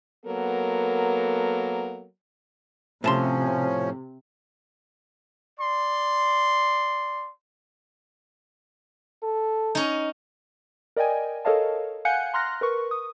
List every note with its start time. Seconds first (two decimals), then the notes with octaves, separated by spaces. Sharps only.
0.25 F#3 A#3 B3 A4 A#4
3.04 A2 C3 F3 C#4 A5 C6
5.59 D5 C6
9.23 A4
9.75 C#4 D#4
10.97 A#4 D5 D#5 G5 G#5
11.45 A4 A#4 C#5 D#5 F5 A5
12.05 F5 F#5 G#5 F#6 G6 C#7
12.34 A#5 C6 F6 F#6 A#6
12.61 A#4 B4 C#6
12.91 D#6